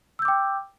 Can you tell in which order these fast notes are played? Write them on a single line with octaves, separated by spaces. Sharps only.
E6 G6 D6 G5